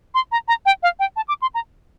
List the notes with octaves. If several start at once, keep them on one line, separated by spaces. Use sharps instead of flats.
C6
A#5
A#5
G5
F5
G5
A5
D6
C6
A#5